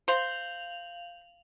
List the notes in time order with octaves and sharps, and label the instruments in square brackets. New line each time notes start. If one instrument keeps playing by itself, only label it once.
[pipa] C5 [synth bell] F5 F7 F#7